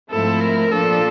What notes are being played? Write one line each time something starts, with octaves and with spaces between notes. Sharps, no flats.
G#2 F3 A3 C4 E4 A4
A#4
A#2 F3 A#3 D4 A4